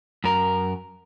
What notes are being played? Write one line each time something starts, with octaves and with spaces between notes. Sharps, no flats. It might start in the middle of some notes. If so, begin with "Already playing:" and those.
F#2 A#4